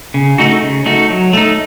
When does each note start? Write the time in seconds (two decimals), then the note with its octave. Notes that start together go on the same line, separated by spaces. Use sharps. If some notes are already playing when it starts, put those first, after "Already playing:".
0.14 C#3
0.38 A3 D#4 F#4
0.62 C#3
0.86 A3 D#4 F#4
1.10 F#3
1.33 A3 D#4